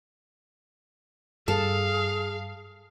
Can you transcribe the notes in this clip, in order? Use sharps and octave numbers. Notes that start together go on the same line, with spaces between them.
G2 G#4 A4 F5